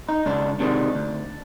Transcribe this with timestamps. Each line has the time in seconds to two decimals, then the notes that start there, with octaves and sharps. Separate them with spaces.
0.09 D#4
0.26 C#2 D4
0.60 C3 D#3 G#3 D4
0.95 D2